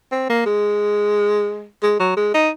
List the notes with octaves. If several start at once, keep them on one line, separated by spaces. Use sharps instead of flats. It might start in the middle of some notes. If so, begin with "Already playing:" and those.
C4
A#3
G#3
G#3
F#3
G#3
D#4